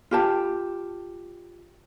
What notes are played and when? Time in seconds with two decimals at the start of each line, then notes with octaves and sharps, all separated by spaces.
0.11 F4 G4 A5